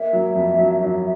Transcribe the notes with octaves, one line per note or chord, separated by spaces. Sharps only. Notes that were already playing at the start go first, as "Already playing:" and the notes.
Already playing: A#3 E5
F#3
F2
F#3
F#3